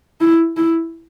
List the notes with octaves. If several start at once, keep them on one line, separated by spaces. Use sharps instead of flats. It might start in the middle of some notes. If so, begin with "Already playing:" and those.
E4
E4